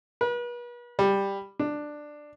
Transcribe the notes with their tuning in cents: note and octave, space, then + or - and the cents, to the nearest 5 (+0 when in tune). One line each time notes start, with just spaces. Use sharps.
B4 -40
G3 +10
D4 +10